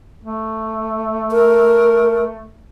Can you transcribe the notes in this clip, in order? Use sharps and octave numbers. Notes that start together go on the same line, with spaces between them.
A3
A#4